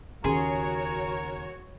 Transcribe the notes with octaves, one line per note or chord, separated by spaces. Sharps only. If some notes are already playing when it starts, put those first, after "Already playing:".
D#2 C#3 F#4 G#4 A#4 C#5 C6